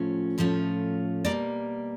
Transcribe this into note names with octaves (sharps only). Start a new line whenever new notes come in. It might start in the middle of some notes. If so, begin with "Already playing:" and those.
Already playing: A2 F3 A3 C#4 F4
A2 F3 A3 C#4 F4
B2 G3 A#3 D5